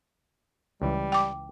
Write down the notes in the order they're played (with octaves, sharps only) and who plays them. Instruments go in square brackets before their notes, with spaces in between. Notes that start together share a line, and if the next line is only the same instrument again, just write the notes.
[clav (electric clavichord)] C#2 E3 [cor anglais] G3
[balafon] G5 D6